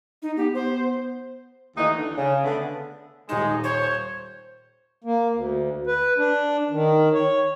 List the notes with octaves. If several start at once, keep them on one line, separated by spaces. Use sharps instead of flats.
D#4
B3 G4
C5
D#2 E3 A3 D#4
D3
C#3
D3 A3 B3
D#1 G#3 D#4 E7
C5 C#5
A#3
D2
B4
D4
D#3
C#5